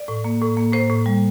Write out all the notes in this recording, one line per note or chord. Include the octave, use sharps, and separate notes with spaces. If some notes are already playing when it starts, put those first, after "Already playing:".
Already playing: D5
A2
A#3
A2
A#3
A2 C5
A2
G3